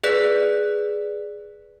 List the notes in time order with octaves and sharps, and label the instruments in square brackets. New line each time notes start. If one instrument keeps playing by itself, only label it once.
[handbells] G#4 B4 D5 F#6 B6